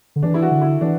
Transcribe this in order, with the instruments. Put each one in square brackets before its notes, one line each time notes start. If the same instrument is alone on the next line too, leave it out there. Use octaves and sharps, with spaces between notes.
[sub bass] D3
[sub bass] E3 [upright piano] D4
[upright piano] E4
F#4
[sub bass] D3
[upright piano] E4
[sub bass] E3 [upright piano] D4